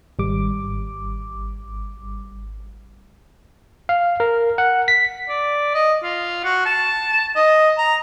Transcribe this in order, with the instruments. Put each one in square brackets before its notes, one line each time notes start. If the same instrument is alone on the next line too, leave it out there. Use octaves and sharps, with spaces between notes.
[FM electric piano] G#1 G3 D6
[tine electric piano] F5
A#4
F#5
B6
[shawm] D5
D#5
F4
F#4
A5
D#5
A#5